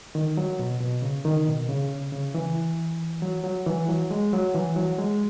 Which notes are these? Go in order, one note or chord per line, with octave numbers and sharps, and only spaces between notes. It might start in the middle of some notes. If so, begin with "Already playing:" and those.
D#3
F#3
B2
B2
C#3
D#3
B2
C#3
C#3
E3
F#3
F#3
E3
F#3
G#3
F#3
E3
F#3
G#3